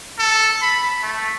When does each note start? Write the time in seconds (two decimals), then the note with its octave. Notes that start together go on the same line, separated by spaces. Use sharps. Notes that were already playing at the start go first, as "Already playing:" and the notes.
0.19 A4
0.62 B5
1.02 A3